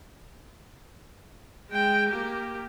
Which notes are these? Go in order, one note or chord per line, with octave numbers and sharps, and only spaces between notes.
G#3 G5
A#3 G4